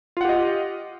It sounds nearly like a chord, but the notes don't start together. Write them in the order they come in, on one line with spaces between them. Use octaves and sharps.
F4 F#5 G4 D#5